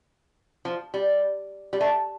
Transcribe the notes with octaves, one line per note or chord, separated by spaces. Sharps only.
F3
G3
G3
A3